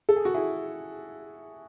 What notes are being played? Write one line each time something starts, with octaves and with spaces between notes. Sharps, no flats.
A4
G#4
F#4
E4 G#4